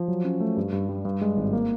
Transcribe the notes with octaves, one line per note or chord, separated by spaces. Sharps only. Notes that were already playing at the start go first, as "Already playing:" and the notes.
Already playing: F3
F#3
C#4
A3
G2
G2
G3
G2
G#3
G#1
A#3